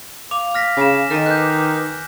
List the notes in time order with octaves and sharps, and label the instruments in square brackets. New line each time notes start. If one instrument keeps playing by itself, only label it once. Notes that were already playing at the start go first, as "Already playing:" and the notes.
[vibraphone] F5 [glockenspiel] D6 F7
[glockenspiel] F6 A#6 B6
[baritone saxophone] C#3 [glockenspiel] G#5 E7
[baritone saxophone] D#3 [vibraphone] A4 D#5
[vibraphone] B4 D6 [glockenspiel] F#6 G6